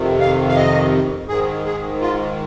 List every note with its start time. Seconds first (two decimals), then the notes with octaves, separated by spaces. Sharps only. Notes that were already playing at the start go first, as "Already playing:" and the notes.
Already playing: F2 C3 D#3
0.20 F5
0.49 F5
0.56 D#5
1.29 G#2 D#3 G#4
1.65 G#4
2.01 F4